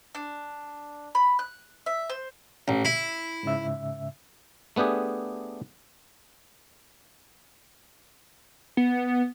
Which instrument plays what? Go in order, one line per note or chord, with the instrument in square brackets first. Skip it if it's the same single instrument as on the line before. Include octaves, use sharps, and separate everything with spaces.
[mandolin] D4
B5
F#6
E5
C5
[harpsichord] A1
E4
[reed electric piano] G#2 C#3 E5
[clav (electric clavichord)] A3 B3 D4 G4 G#4
[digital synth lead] B3